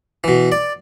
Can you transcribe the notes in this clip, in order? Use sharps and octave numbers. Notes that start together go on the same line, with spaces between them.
B2 E3
D5